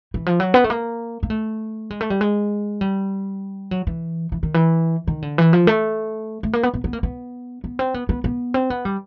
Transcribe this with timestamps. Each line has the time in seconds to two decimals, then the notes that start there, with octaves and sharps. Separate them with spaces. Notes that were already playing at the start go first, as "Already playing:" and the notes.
0.14 E3
0.26 F3
0.40 F#3
0.54 B3
0.64 A3
0.70 A#3
1.23 A#3
1.30 A3
1.90 G#3
2.01 A3
2.10 G3
2.21 G#3
2.81 G3
3.71 F#3
3.87 E3
4.32 E3
4.43 D#3
4.54 E3
5.07 D#3
5.22 D3
5.38 E3
5.53 F3
5.67 A3
6.43 A3
6.53 A#3
6.63 B3
6.74 B3
6.84 B3
6.93 A#3
7.03 B3
7.64 B3
7.79 C4
7.94 B3
8.09 B3
8.24 B3
8.54 C4
8.70 B3
8.85 G3